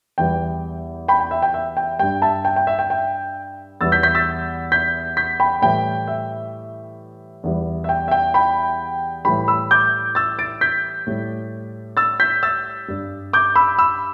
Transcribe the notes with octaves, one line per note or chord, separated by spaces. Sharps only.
E2 E3 G3 G5
G5 B5
G5
E5
G5
E5
G5
G2 G3 G5
E5 A5
G5
G5
E5
G5
G5
E2 E3 G3 E6 A6
G6 B6
G6 B6
E6 A6
G6 B6
G6 B6
G5 B5
A2 E3 G3 G5
E5
E2 E3 G3
E5
G5
E5
G5
G5 B5
A2 E3 G3 G5 B5
B5 E6
D6 G6
E6 A6
A6 D7
G6 B6
A2 G3
E6 A6
G6 B6
E6 A6
G2 G3
D6 G6
B5 E6
B5 E6